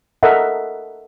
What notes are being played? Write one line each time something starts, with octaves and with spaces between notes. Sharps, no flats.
A4 A#4 D#5 E5 F#5